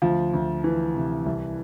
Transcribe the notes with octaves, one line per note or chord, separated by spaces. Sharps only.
D2 F3
D2
E3
C3
C2